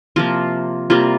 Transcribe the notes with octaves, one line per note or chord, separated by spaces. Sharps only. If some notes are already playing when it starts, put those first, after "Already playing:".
C3 F3 A#3 F4
C3 G3 A#3 F4